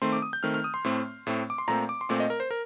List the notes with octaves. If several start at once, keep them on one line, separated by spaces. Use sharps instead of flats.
D#3 A3 C4 C6
D6
D#6
G6
D#3 A3 C4 F6
F6
D#6
C6
A2 A3 C4
A2 A3 C4
D6
C6
A#2 A3 C4 A#5
D6
C6
A#2 A3 C4 D6
D#5
A#4
C5
A#4